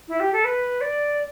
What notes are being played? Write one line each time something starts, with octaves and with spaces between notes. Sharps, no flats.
E4
G4
A4
B4
D5